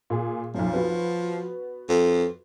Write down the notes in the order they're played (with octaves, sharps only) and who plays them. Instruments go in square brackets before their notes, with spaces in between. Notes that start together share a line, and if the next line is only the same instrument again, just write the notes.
[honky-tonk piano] A#2 G#4
[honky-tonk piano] B1 F#2 [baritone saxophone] F3
[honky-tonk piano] B3 F#4
[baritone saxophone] F2